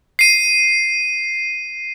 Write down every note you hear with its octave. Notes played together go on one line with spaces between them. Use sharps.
C7 D#7